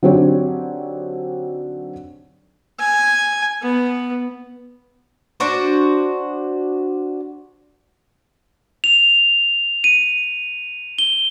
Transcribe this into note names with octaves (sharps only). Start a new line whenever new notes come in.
D3 F#3 C4 D#4 G4 C#5
G#5
B3
D4 F#4 C5
F7
D#7
G7